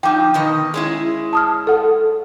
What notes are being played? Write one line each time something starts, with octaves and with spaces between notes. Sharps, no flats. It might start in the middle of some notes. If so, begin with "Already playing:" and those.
F3 D#4 G5 D6
B2 D#3 D#5
G#3 C#4 E4
A5 D#6 F6
A4 F#5